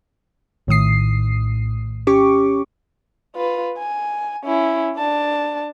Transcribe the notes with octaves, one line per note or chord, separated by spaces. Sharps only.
A#1 A2 D#3 D#6 C7
C#4 G4 C#6 D6
F4 B4
G#5
C#4 E4
D4 A5